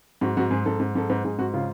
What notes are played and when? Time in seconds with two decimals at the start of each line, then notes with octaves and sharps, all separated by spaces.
0.21 G#2 F#4
0.37 G#2 F#4
0.51 G#2 G#4
0.66 G#2 A4
0.80 G#2
0.95 G#2 A4
1.10 G#2 B4
1.24 G#2 G#4
1.39 G#2 F#4
1.54 C#3 F4